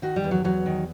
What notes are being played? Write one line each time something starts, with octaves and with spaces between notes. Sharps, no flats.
D#3 F#4
G3
E2
F#3
E2 F#3
D#3